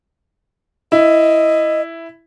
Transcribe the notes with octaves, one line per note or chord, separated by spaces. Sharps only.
E4 D#5